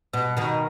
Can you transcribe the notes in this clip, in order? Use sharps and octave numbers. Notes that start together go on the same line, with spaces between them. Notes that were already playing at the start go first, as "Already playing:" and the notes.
B2
B2 D#3